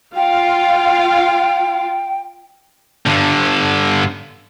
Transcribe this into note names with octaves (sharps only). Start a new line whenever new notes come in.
F4 F5 G5
G2 D3